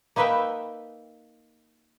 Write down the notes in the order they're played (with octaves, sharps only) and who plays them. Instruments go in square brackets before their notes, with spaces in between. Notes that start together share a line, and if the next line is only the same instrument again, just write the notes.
[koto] A#3 D#4 B4 D#5 E5 G5